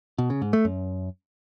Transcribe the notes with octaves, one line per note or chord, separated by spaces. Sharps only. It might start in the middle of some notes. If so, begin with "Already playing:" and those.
B2
C#3
G#2
A3
F#2